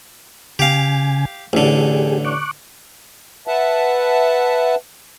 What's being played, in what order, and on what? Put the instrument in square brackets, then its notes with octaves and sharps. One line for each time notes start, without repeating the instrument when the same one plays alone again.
[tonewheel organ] C#3 G#5 [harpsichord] G4 F5
[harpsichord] A1 D3 [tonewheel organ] G4 G#4
[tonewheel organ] C#6 D6 F#6
[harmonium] B4 E5 F#5 A5